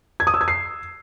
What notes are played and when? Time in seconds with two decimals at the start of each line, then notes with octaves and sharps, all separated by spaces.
0.20 G#6
0.27 D#6
0.34 E6
0.41 G#6
0.48 C7